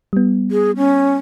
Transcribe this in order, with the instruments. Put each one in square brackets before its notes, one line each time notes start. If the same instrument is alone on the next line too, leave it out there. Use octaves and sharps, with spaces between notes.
[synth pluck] G3 B3
[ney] G#4
C#4